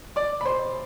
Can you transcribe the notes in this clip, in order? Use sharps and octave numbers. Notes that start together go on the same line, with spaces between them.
D5 D6
B5
C5 C6